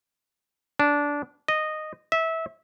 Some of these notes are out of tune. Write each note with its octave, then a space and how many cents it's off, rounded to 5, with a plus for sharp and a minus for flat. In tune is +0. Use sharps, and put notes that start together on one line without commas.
D4 -15
D#5 -10
E5 -20